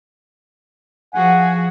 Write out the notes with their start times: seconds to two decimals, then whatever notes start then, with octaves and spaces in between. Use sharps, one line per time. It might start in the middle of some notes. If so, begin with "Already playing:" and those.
1.14 F3 F#4 G#4 F#5 G#5